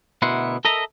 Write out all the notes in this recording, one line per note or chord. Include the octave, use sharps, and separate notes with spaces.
D2 B2 E4 A#4 F#5 C6
A4 A#4 D#5 E5 A#5